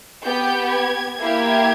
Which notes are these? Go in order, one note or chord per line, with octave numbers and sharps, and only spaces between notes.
B3 G4 G6
G#6
A#3 E4 G4 G#6